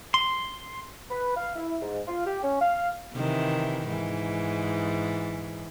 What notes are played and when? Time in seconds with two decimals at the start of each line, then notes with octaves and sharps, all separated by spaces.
0.14 C6
1.11 B4
1.36 F5
1.56 E4
1.82 G#2
2.08 F4
2.26 G4
2.43 C#4
2.61 F5
3.13 C3 D#3 E3
3.88 G#2 E3